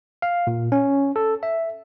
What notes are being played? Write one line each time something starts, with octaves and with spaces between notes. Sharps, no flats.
F5
A#2
C#4
A4
E5